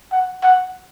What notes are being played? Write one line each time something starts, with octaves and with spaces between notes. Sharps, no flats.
F#5
F#5